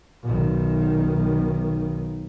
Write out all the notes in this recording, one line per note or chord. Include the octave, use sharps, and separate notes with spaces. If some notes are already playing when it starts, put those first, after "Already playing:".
B1 D#3